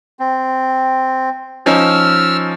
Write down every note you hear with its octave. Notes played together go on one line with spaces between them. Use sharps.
C4
F3 C#4 D#4 E6 F6